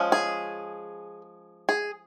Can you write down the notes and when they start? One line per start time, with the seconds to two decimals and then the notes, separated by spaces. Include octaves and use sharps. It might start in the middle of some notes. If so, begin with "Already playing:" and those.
Already playing: F3 G#3 C#4
0.12 G#4
1.69 G#4